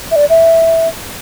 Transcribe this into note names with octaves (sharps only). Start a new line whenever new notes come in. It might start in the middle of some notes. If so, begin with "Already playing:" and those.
E5
D5
E5